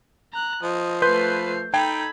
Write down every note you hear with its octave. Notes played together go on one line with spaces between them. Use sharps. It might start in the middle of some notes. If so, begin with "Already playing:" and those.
A#5 F#6
F3 D#5
A3 B4 C6 G6 C7
D#4 A4 G5 B5 G#6